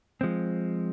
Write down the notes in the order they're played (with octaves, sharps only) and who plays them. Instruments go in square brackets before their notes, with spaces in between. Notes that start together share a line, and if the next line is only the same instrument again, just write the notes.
[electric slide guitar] F3 G#3 C4